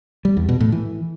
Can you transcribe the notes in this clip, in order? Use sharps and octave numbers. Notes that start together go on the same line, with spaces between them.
G3
E2
B2
A2
E3